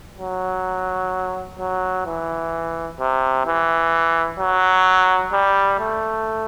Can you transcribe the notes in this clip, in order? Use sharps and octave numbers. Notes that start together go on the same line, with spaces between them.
F#3
F#3
E3
C3
E3
F#3
G3
A3